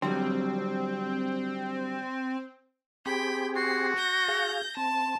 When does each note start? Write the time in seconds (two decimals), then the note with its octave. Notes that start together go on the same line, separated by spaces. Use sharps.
0.02 D3 F#3 G3 C4
3.06 C4 G4 G#4 G5 B5
3.56 F#4 C7
3.97 G6 A#6
4.28 G#4 F5
4.77 C4 A5